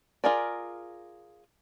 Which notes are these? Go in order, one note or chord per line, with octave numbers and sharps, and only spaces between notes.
F4 G#4 A#4 D5